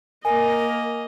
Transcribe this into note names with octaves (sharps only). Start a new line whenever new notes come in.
A#3 A#4 D#5 G#5